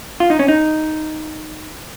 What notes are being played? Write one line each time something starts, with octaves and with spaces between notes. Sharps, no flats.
F4
D#4
C#4
D#4